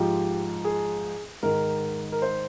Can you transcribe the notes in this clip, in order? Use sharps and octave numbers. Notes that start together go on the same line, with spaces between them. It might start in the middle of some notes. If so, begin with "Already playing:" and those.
Already playing: G#2 F3 G4
G#4
G#2 D#3 A#4
A#4
C5